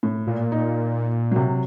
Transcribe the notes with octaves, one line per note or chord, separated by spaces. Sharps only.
A2
A#2
D#4
C3 F#3